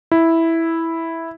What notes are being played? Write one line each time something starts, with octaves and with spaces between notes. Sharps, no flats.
E4